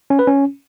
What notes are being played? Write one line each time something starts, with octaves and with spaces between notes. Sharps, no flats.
C#4
B4
C#4